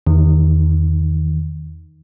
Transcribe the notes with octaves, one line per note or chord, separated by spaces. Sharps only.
E2 D#3